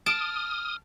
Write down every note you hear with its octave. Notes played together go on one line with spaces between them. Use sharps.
A5 D#6 F6 D7